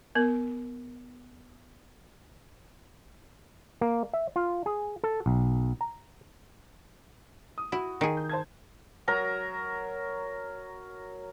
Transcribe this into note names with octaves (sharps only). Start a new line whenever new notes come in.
B3 A#4
A#3
E5
F4
G#4
A4
B1
A#5
D#6
E4 F#4
D#3 G#4
G6
C5 A5 G#6
F#3 A#4 A#5